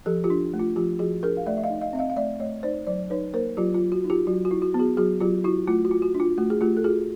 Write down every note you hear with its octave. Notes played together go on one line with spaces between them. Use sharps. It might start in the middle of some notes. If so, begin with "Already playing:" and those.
F3 G4 A4
F4 G4
D4
A3
F4
F3 F4 G4
F3 F#4 G#4
D4 G#4 A#4
F5
A3 D5 E5
E5
D#5 F5
D#4
D#5 F5
C4 E5
D#5 F5
F5
A3 D5 E5
A3 C#5 D#5
D#4 C5 D5
F#3 C5 D5
D#4 B4 C#5
A#3 A#4 C5
F#3 F4 G4
F4
F#3
F#4
D#4
F4 G4
F#3 F#4
F#4
E4
F#4
B3
F#4 G#4
F#3 F#4 G#4
F#3 F4 G4
E4 F#4
A3 F4
F#4
F4
F#4
D4
F4
A3 F#4
G#4
A3 F4 G4
A4
F4 F#4 G#4